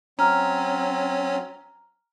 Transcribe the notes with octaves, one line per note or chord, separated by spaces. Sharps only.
F#3 C4 C#4 A#5 F6